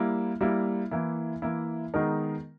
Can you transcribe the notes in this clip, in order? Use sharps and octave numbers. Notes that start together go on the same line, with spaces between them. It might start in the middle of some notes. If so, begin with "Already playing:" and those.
Already playing: G3 A#3 E4
G3 A#3 E4
E3 A#3 E4
E3 A#3 E4
D#3 G#3 B3 D#4 A#4